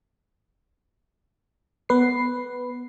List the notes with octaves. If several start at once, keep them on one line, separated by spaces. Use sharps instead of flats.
B3 B4 C7